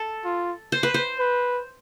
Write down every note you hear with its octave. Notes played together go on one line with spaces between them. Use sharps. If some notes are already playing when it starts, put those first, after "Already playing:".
Already playing: A4
F4
C5
B4
C5
B4